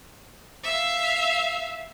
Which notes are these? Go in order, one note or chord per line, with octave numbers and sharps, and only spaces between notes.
E5 F5